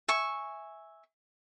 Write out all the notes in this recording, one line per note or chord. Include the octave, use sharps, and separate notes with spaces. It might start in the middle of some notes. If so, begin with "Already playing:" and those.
E5 G#5 C#6